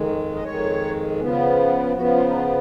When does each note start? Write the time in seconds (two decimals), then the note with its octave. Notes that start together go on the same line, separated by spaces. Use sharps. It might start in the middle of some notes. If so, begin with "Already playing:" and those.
Already playing: F2 D#3 G#3
0.35 D#5
0.44 F2 D#3 G#3 C#5
1.20 C#3 F3 B3
1.96 C#3 F3 B3 F#4
2.15 F4
2.29 D#4
2.34 F4